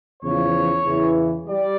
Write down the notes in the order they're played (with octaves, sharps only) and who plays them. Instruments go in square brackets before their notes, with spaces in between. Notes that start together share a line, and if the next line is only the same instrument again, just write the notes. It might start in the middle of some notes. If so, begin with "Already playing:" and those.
[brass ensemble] E2 C#3 F3 C#5
E2 C#3 E3
G3 D5